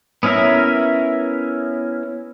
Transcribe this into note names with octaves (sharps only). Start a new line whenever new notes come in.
B3 C#4 E4 A#4 E5